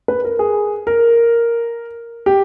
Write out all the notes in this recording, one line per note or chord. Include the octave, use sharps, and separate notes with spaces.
B4
A#4
G#4
A#4
G4